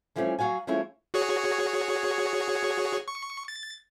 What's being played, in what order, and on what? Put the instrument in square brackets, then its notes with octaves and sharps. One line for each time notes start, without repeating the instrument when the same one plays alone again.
[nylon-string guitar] E3 F3 G3 A3 A#3 C#4
F#3 F#4 F5 G#5
F3 G#3 A3 C#4 E4
[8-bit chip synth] F#4 G#4 C#5
C#6
A6